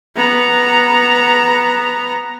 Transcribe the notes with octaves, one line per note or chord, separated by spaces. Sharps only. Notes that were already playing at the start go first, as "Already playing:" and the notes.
B3 A#5